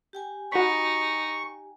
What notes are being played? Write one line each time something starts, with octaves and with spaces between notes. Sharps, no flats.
G4 G5 G#5
D#4 F#4 B5 C#6